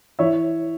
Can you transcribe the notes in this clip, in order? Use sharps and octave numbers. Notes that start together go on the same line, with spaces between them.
E3 C#5 E5